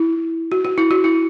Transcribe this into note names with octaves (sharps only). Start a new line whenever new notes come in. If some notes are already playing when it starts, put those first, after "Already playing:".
Already playing: E4
F#4
F#4
E4
F#4
E4